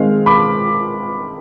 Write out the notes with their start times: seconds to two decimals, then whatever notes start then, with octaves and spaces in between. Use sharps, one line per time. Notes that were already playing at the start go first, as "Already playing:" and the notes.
Already playing: D#3 G#3 C4 F5
0.26 B5 D6